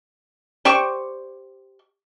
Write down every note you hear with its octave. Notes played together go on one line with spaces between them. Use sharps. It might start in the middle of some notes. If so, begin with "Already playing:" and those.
G4 C5 D5 C#6